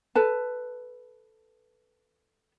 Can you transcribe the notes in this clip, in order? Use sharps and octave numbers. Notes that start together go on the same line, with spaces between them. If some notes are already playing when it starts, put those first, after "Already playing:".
A4 B4 A5